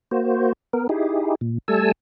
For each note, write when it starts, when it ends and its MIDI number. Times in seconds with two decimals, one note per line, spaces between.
0.11 0.53 58
0.11 0.53 66
0.11 0.53 72
0.73 0.87 59
0.73 0.87 70
0.89 1.35 63
0.89 1.35 64
0.89 1.35 67
0.89 1.35 68
1.41 1.58 46
1.68 1.92 55
1.68 1.92 57
1.68 1.92 69
1.68 1.92 80
1.68 1.92 81
1.68 1.92 88